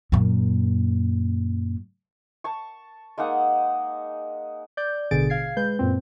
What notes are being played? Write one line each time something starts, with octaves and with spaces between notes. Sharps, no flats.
F#2 A#2
A5 C#6
G#3 A#3 D#4 F#5
D5 G6
A1 B2 D3 G#4 A6 D7
F5 G#6 C7
G#3 B4 G6
F#2 A#2 C4